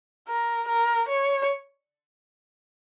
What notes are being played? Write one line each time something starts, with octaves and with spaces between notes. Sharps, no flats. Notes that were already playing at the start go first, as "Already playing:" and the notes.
A#4
A#4
C#5